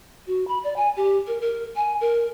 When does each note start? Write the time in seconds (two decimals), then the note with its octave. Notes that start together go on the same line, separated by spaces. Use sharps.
0.27 F#4
0.48 B5
0.64 D5
0.76 G#5
0.96 G4
1.27 A#4
1.41 A#4
1.76 G#5
2.01 A#4